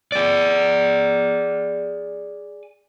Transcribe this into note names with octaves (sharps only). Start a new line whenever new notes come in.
G#4 D5